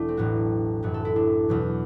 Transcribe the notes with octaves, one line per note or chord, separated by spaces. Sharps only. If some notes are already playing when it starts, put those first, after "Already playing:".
Already playing: E1 A3 D4 E4
C4
A1 A2 F#3 F#4
F#1 F#2 E3 F#4
A4
E4
D4
E2 B2 F#3